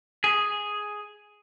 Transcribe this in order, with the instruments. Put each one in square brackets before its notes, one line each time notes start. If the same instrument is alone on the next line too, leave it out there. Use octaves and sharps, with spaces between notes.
[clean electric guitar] G#4